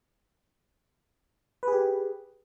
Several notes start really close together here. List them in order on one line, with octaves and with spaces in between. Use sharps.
B4 G#4 G4